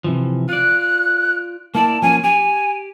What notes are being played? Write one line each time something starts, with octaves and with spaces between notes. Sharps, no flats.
C3 E3 F3
F4 D5 F#6
A#3 E4 D5 A5
F3 A#3 C#4 G#5
G4 G#5